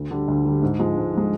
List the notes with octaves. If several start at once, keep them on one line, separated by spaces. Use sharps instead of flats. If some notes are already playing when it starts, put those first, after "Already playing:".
Already playing: D2
D3 G3
D2
D3 G3
G#2
F3 G#3
G#2
F3 G#3